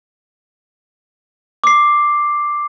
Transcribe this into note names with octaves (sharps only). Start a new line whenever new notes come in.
D6 C7